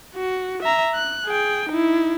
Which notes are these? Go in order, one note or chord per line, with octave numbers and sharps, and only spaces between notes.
F#4
E5 A#5
F#6
G#4 G5
D#4 E4